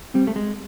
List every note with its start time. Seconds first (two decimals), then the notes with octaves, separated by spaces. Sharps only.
0.14 G3 C4
0.27 A3
0.36 G#3